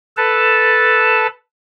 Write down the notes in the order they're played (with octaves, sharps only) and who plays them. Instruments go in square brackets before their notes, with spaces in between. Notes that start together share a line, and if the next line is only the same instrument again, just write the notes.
[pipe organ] A4 B4 A5